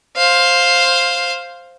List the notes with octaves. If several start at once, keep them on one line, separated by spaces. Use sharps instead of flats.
C5 F5